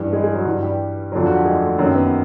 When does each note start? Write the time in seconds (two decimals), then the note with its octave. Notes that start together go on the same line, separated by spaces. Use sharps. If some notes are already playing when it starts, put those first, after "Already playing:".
Already playing: G2 E3
0.13 G#3 G#4
0.24 G#3 G#4
0.35 F#3 F#4
0.46 G2 E3
0.62 G3 G4
1.12 F2 D3 F#3 F4
1.26 F#4
1.36 G4
1.45 G#3 G#4
1.62 A3 A4
1.78 F#2 D#3 F#3 A#3 A#4
1.95 B3 B4